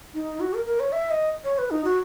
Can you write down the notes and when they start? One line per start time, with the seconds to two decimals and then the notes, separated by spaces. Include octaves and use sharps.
0.14 D#4
0.40 F#4
0.54 A#4
0.66 A#4
0.80 C#5
0.92 E5
1.11 D#5
1.44 C#5
1.58 B4
1.71 D#4
1.84 F#4